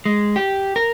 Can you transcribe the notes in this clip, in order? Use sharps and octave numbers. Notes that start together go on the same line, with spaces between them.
G#3
G4
A#4